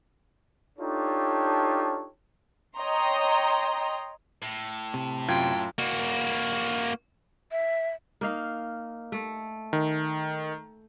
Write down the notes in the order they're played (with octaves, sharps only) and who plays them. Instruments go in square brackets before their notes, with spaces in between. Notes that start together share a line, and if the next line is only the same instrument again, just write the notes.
[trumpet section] D4 D#4 F4 G4 A4 C#5
[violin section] C#5 D#5 G5 A#5 C6
[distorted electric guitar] A2
[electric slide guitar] C3
[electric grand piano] F#2 F4 G#6 [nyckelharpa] G5
[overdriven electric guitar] A#3 F#4
[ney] E5
[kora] A#3 D#4 F5
A3
[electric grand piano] D#3